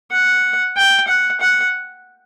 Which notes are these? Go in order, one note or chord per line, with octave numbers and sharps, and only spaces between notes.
F#5
G5
F#5
F#5